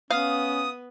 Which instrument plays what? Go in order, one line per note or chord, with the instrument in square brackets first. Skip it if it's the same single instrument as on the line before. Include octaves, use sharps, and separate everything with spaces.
[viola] B3 [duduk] C#4 [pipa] F5 [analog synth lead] D#6